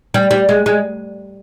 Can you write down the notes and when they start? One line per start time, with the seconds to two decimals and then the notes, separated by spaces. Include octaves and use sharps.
0.14 G3
0.31 G3
0.49 G#3
0.66 G#3